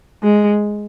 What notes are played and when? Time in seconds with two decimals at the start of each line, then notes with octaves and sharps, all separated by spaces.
0.23 G#3